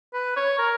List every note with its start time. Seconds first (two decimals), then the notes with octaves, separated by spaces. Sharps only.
0.14 B4
0.37 C#5
0.59 A#4